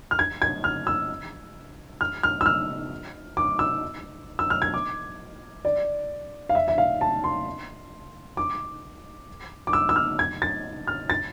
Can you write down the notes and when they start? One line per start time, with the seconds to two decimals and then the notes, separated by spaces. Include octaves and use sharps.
0.11 F6
0.19 G#6
0.42 G#6
0.64 F6
0.87 E6
2.01 F6
2.23 F6
2.41 E6
2.46 F6
3.37 D6
3.59 E6
4.39 E6
4.50 F6
4.62 G#6
4.74 D6
5.65 D5
6.49 F5
6.55 E5
6.68 E5
6.78 F5
7.01 A5
7.24 C6
8.37 D6
9.67 D6
9.73 E6
9.89 E6
9.96 F6
10.19 G#6
10.42 A6
10.87 F6
11.10 A6